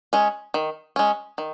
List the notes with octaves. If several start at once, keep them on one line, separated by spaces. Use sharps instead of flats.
G#3 C#4
D#3
G#3 C#4
D#3